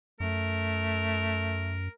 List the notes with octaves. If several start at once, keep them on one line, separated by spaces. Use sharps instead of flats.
F#2 A3 A#4